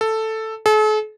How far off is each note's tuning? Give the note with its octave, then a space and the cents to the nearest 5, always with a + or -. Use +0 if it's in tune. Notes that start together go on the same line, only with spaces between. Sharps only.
A4 +5
A4 -45